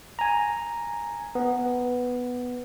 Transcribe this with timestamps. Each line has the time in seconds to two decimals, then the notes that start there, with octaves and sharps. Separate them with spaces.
0.19 G#5 A#5
1.35 B3